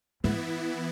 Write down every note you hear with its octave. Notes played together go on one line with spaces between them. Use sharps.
G#2 E3 B3 E4